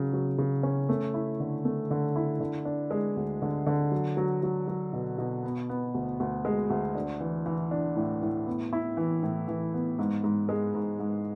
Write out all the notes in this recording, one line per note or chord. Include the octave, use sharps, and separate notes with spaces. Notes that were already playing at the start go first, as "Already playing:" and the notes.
Already playing: C#3 F#3
F#3
C#3
C#4
A3
E4
D3
A3
D3
E4
D3
D4
G#3
D2
D3
D3
F#3
F#3
F#3
F#3
B2
B2
B3
B3
D2
D2
G#3
D2
D4
E3
E3
D4
A2
A2
B3
E4
E3
A2
E3
B3
G#2
G#2
G#3
G#2
G#2